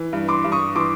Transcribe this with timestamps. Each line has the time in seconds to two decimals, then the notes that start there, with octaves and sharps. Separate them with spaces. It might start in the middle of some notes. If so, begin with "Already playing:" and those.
Already playing: E3
0.13 G2
0.28 C6 D6
0.44 G2
0.52 C#6 D#6
0.75 E3 C6 D6